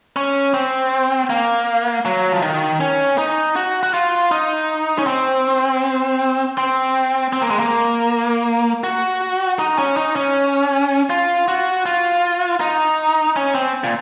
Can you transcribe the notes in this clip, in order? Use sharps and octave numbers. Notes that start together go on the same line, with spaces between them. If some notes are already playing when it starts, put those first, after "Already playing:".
C#4
C4
A#3
F#3
F3
D#3
C#4
D#4
F#4
F#4
F4
D#4
C#4
C4
C4
C4
A#3
G#3
A#3
F#4
D#4
C#4
D#4
C#4
F4
F#4
F4
D#4
C#4
C4
A#2